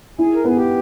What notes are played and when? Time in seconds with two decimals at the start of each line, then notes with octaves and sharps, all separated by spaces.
0.18 E4 G#4
0.35 A#4
0.45 B3 G#4
0.57 G4